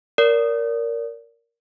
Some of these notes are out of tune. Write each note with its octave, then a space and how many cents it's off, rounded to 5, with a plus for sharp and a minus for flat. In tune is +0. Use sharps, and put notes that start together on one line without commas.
A#4 +0 D5 -30